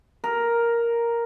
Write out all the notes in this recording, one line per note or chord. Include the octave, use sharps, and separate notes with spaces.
A#4